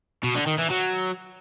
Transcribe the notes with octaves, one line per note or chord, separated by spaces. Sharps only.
B2
D3
D#3
E3
F#3